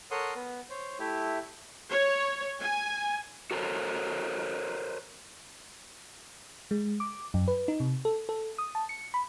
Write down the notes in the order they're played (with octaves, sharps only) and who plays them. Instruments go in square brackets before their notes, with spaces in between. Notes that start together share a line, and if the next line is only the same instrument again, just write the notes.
[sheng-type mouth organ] A4 A#4 C#5 F#5 C6 D#6
B3
C5 C#5
A3 E4 G4
[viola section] C#5
G#5
[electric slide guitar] F#4 A4 A#4 C5 C#5
[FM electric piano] G#3
D6
F#2
B4
D#4
C3
A4
A4
D#6
A5
C#7
B5